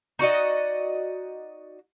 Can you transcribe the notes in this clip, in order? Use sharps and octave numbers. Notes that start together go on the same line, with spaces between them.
D#4 F#4 D5 D#5